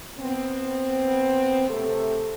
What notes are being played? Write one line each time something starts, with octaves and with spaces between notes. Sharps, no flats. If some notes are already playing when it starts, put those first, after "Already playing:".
B3 C4
C3 A3 C4 A4